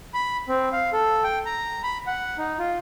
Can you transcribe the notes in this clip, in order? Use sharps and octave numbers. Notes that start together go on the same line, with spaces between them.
B5
C4
F5
A4
G5
A#5
B5
F#5
D#4
F4